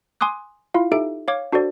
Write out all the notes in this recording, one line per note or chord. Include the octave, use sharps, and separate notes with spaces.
G#5 C6 D6 D#6 F#6
E4 F4 F5
D#4 G4 A4 E5 D7
C#5 F5 D6 G#6
D4 F#4 A4 C5 D5